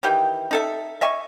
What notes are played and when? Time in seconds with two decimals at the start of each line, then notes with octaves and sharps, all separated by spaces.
0.03 D#3 E3 G4 G5
0.51 D#4 A4 E5
1.01 D#5 E5 G#5 C#6